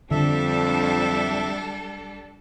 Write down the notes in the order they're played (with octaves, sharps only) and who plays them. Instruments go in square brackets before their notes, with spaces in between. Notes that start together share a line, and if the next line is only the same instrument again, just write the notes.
[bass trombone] F2 [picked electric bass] D3 [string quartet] G3 D4 A4 [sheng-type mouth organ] E5